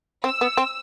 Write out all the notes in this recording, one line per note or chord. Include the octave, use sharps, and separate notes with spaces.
C4 E6
B3
C4